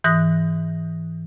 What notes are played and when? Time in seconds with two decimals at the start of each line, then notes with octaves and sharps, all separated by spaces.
0.04 G#2 E3 D#6 F#6 A#6